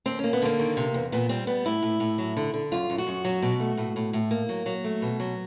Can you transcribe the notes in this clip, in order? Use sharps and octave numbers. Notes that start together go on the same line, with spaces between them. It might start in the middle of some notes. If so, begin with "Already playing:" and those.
D#2 C4
A#3 C#4
B3
D3 A#3
D#3
C3
E2
A#2 B3
G3 C4
G3 B3
A2 E4
A2
A2
F#3
D3
D3
F#2 F4
F#2
F#4
F#2
F#3
B2
A3
A2
A2
A2
A#3
F#3
F#3
A3
B2
F#3